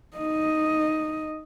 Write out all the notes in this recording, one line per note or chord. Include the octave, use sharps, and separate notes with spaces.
D#4 D#5